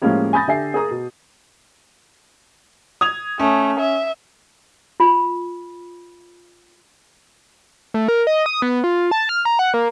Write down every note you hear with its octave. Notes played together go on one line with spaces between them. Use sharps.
A2 F3 G#3 A#3 C#4 G4
G#5 B5 D#6 G6 A6 A#6
D3 G4 E5 G#5 C7
G#4 A#4 A#5 D#6
B2
D#6 G#6 F7
A3 C#4
E5
F4 B5
A3
A#4
D#5
D#6
B3
F4
A5
F6
A#5
F#5
A#3